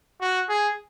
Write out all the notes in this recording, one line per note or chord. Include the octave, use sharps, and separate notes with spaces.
F#4
G#4